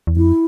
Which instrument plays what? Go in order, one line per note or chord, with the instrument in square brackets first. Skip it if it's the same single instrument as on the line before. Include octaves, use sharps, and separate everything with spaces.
[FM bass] E2
[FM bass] F2 [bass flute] E4